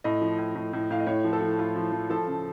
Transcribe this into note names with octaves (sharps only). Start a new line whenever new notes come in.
A2 D#5
F3
A2
A2
A2
A2 F5
D#5
A2 C#5
F3
A4
F3
A2 F4
F3
F3
F3 A4
C#3